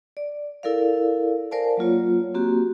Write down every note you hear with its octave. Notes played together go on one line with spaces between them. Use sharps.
D5
E4 A4 A#4 D5 F5
A#4 C5 D5 F5 G#5 A5
F#3 A#3 F4 C#5
A#3 C4 F#4 G4